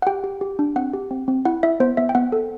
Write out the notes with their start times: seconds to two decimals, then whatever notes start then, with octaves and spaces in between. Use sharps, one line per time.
0.02 F#5
0.07 G4 G5
0.24 G4
0.41 G4
0.59 D4
0.76 C4 F#5
0.93 G4
1.11 C4
1.28 C4
1.45 E4 F#5
1.63 E4 E5
1.80 B3 C5
1.97 B3 E5
2.09 G5
2.15 B3 F#5
2.32 A4